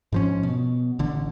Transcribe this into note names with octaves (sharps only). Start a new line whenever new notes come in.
G#2 F3 C#4
B2
A1 D3